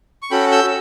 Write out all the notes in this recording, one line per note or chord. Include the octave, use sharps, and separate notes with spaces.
C#6
C#4 F#4 A4 G5 B5
E6 G6